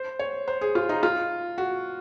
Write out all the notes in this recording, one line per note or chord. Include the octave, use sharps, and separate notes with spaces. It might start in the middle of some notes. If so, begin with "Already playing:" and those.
Already playing: C5
C#5
C5
G#4
F4
D#4
F4
F#4